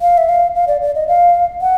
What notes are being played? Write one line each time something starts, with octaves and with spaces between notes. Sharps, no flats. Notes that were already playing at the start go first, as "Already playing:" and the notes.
F5
E5
F5
F5
D5
D5
D#5
F5
F#5